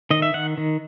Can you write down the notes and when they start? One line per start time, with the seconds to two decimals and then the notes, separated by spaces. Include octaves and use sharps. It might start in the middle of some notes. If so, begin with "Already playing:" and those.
0.11 D#3 D#5
0.22 E5
0.34 D#3 F#5
0.57 D#3